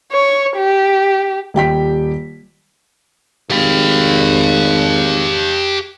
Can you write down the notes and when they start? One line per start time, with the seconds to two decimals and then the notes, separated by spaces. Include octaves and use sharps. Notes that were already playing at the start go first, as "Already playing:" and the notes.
0.12 C#5
0.57 G4
1.54 D#1 G4 G5 B6
3.50 G#1 G4 F5